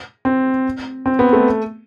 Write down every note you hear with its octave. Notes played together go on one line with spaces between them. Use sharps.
C4
C4
B3
A3